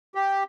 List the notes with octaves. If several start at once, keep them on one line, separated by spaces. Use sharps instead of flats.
G4